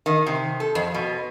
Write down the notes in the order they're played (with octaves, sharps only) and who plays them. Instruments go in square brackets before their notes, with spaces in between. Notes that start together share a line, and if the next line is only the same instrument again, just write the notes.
[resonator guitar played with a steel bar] D#3
C3
A4
F2
B2